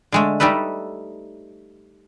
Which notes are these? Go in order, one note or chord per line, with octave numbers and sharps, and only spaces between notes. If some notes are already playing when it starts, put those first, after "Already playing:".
D3 G#3 A3
G3 A3 D#4 A4 B4